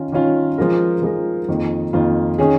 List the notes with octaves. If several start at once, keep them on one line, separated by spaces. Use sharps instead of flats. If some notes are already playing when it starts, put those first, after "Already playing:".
Already playing: D#3 C#4 F4
D#3 C#4 F4
F3 G#3 F4 A#4
F3 G#3 F4 A#4
F2 D#3 A#3 F4
F2 D#3 A#3 F4
D#3 C#4 G#4